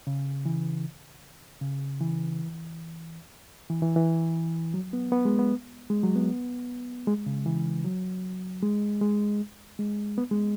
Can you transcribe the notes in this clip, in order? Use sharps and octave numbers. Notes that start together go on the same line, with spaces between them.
C#3
E3
C#3
E3
E3
E3
E3
F#3
B3
B3
G#3
B3
G#3
F#3
B3
G#3
C#3
E3
F#3
G#3
G#3
G#3
B3
G#3